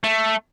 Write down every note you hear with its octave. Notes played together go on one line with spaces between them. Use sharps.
A3